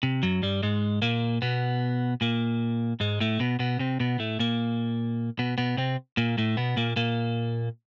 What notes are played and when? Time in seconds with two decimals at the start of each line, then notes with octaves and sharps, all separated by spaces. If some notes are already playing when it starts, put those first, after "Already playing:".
0.03 C3
0.23 F#2 F#3
0.42 G2 G3
0.63 G#2 G#3
1.02 A#2 A#3
1.42 B2 B3
2.21 A#2 A#3
3.00 G#2 G#3
3.20 A2 A3
3.40 B2 B3
3.59 B2 B3
3.79 C3 C4
4.00 B2 B3
4.19 A2 A3
4.39 A#2 A#3
5.39 B2 B3
5.58 B2 B3
5.77 C3 C4
6.17 A#2 A#3
6.38 A2 A3
6.57 B2 B3
6.77 A#2 A#3
6.96 A#2 A#3